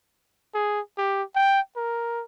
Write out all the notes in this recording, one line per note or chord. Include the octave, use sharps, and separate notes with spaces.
G#4
G4
G5
A#4